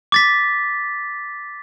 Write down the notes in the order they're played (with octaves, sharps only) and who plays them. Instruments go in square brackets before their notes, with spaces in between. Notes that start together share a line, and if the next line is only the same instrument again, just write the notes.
[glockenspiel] D6 A6 B6